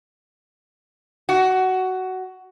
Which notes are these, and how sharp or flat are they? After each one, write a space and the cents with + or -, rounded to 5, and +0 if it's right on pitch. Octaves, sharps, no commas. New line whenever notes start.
F#4 +15